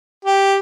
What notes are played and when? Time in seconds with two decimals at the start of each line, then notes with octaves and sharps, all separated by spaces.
0.25 G4